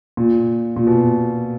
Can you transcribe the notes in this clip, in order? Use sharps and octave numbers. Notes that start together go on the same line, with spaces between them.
A#2
A#2
B2